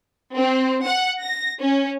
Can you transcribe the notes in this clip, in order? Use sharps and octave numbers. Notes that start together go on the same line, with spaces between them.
C4
F#5
A#6
C#4